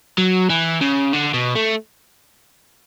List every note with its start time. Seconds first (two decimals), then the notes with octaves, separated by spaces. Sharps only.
0.18 F#3
0.50 E3
0.81 C#3
1.13 D3
1.34 B2
1.55 A3